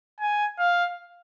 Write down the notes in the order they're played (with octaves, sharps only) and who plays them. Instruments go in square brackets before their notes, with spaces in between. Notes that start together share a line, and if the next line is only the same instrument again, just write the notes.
[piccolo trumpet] G#5
F5